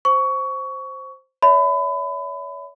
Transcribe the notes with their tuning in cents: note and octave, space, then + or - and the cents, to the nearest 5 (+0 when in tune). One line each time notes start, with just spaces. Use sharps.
C5 +0 C#6 +20
C#5 +35 E5 -20 B5 +30